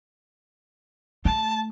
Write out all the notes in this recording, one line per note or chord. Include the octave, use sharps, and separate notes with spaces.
A3 A5